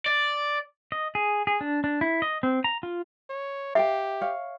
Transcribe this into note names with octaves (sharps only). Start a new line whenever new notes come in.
D5
D#5
G#4
G#4
D4
D4
E4
D#5
C4
A#5
F4
C#5
G4 E5 F5 G5
C#5 F5